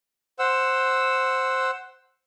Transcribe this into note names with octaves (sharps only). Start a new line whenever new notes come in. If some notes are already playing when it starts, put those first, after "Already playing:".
C5 F#5 E6